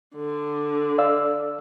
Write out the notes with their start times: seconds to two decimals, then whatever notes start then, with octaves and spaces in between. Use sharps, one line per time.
0.15 D3
0.98 D5 F5 E6